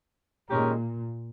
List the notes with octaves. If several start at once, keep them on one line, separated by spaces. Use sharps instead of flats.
A#2 D#3 G#3 C#4 G4 A#4